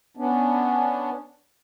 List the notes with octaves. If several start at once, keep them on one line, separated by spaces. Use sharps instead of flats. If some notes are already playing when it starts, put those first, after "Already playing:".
B3 C#4 D4